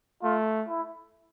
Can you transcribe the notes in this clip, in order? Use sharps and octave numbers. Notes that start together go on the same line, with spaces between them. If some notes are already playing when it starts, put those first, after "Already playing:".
A3 F4
E4